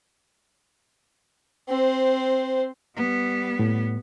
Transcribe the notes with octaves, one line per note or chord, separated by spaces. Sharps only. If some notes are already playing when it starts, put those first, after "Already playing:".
C4 C5
G3 B3
A2